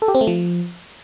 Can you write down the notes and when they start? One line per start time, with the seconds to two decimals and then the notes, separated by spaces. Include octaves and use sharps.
0.02 A4
0.08 G4
0.15 C4
0.21 A3
0.27 F3